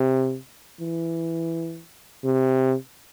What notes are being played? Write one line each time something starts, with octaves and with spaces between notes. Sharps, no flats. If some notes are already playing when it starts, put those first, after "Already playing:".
Already playing: C3
E3
C3